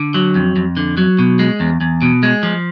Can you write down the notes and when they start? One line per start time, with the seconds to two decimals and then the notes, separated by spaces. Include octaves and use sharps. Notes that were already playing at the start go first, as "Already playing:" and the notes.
Already playing: D3
0.14 F#3
0.35 F2
0.56 F2
0.77 D3
0.97 F#3
1.19 B2
1.39 G#3
1.60 E2
1.81 E2
2.02 B2
2.23 G#3
2.43 F3